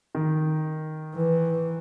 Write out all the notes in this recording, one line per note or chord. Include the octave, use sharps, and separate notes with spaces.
D#3
E3